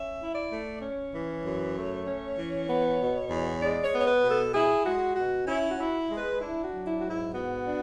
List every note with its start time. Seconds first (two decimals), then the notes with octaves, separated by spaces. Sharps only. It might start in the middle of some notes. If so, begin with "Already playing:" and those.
Already playing: C#4 E5
0.19 E4
0.35 D5
0.51 A3
0.81 C#4 C#5
1.12 E3
1.44 F#2
1.75 A3
2.06 C#4
2.36 E3
2.68 B3
2.99 B2
3.30 E2
3.61 G#3 D5
3.84 C#5
3.92 B3
4.01 C#5
4.07 B4
4.23 B2
4.30 A4
4.53 E4 G#4
4.85 G#3 F#4
5.16 B2 F#4
5.47 C#4 E4
5.71 F#4
5.78 E4
6.09 G#3
6.17 B4
6.40 D4 E4
6.64 F#4
6.72 F#3
6.87 E4
7.00 G#2 F#4
7.10 E4
7.33 B3 F#4
7.65 D4